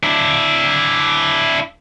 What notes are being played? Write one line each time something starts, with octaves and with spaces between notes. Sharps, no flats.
D4 E4